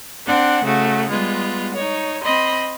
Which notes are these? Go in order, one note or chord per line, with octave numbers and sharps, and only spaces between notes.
C4 D4 F#5
C#3 A3 F#4
G3 G#3 B3 F4
D#4 C#5
C4 D#5 B5 C6